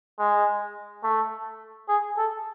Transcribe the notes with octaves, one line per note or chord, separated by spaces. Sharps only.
G#3
A3
G#4
A4